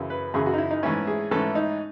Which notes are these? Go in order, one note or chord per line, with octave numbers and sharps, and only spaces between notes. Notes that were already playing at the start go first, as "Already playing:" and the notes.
Already playing: F#2 C#3 E3
B4
F#2 C#3 E3 G#4
F#4
D#4
E4
D#4
G#2 E3 A3 C#4 E4
G#4
G#2 E3 A3 C#4 A4
D#4